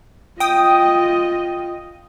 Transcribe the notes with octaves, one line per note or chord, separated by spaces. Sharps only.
F4 D#5 G5 D#6